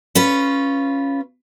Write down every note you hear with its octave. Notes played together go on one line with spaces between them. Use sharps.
C#4 F4 B4